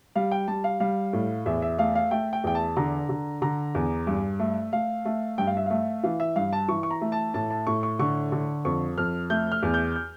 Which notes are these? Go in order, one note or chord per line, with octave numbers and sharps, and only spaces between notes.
G3 F5
G5
G3 A5
F5
G3 F5
A2
E2 E5
E5
A3 F5
F5
A3 G5
G5
E2 G5
A5
D3 A#5
D3
D3 A#5
E2
G2
A3
A3 F5
A3
G2 G5
F5
E5
A3 F5
E3 F5
E5
G2 F5
A5
E3 C#6
C#6
A#5
A3
A5
A2 A5
A5
A2 C#6
C#6
D3 C#6
D3
F2 C#6
F2 F6
A3 G6
F6
E2
G6
G6